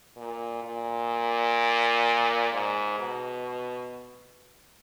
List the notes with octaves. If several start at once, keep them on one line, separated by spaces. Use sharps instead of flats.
A#2
A#2
G#2
B2